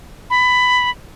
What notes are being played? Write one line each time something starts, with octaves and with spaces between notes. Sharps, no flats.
B5